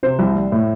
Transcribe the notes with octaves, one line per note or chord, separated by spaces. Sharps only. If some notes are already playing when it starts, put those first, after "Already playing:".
C3 C5
C2
G3
A2